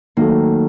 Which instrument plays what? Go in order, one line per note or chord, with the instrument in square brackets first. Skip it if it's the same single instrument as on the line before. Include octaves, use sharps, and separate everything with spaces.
[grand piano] D#3 F#3 A3 [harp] A#3